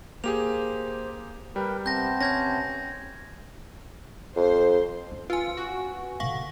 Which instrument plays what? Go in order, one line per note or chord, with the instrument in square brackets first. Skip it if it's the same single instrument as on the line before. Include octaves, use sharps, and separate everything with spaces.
[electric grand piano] A#3 G4 G#4 [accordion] C5 [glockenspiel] F7
[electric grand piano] G3 [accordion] A#4 B4 G5
[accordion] C3 B3 A5 [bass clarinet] C4 [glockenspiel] G6 A#6
[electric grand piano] C#4 [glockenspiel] G6 G#6 A#6
[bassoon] F2 [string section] C5
[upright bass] C#4
[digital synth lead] F4 [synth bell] B4 G#5
[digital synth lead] F#4
[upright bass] B2 D3 [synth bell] F5 F#5 C#6